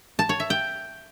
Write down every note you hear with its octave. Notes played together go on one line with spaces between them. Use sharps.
A5
C#5
E5
G5